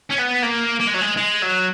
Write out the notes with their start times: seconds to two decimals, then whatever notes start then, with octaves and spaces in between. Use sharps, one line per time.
0.10 C#4
0.18 B3
0.42 A#3
0.80 A#3
0.87 G#3
0.94 F#3
1.01 G#3
1.17 G#3
1.42 F#3